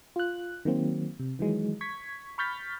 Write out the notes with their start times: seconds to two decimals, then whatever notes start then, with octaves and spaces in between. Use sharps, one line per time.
0.16 F4 F#6
0.65 D#3 F#3 A#3 C4
1.19 C3
1.39 D#3 E3 F#3 G#3
1.81 C#6 G#6 B6
2.38 B5 C#6 F6 G6 A6 B6